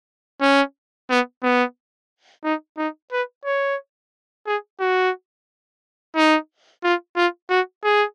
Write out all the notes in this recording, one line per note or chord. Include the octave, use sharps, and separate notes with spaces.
C#4
B3
B3
D#4
D#4
B4
C#5
G#4
F#4
D#4
F4
F4
F#4
G#4